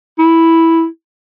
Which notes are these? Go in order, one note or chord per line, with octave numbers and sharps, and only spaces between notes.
E4